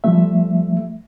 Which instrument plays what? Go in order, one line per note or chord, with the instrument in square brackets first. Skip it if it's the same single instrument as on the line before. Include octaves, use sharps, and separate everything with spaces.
[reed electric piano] F3 G3 A3 E5